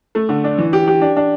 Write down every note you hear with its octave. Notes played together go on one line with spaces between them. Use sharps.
A3
D3
D4
E3
G4
G4
D4
D4